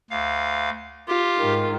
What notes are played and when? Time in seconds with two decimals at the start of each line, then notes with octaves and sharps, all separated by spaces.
0.10 D2 F5
1.08 F4 G4
1.38 G#2 D#3